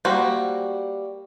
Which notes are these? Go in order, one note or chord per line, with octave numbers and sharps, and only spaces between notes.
G3 A#3 F#4 C5